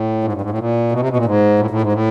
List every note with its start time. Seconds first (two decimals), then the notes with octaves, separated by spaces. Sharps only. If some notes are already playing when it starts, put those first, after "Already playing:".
Already playing: A2
0.24 G#2
0.33 G2
0.41 G#2
0.50 A2
0.58 A#2
0.92 B2
1.00 C3
1.09 B2
1.17 A#2
1.26 G#2
1.60 A2
1.70 A2
1.82 G#2
1.93 A2